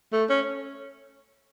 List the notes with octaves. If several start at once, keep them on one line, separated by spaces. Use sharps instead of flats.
A3
C#4